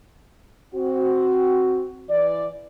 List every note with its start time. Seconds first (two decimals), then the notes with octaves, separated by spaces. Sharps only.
0.74 C4 F#4
2.10 E3 D5